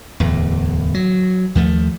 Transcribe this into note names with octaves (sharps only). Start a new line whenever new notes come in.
D1 E2
F#3
D#2 F3 A3